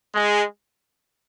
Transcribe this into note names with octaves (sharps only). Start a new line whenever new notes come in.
G#3